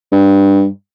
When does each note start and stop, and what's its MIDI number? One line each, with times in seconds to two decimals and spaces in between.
0.12 0.67 43